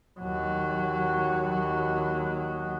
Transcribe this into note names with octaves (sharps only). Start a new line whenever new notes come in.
D#2 F#3